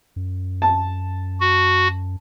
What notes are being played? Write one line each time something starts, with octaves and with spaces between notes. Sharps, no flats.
F#2
A5
F#4